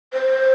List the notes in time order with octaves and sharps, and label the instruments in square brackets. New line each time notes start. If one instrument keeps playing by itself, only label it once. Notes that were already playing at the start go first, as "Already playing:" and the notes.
[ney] C5